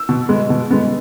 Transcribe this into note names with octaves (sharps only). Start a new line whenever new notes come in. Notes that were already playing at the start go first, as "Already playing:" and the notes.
Already playing: E6
B2
G#3 B3
B2
G#3 B3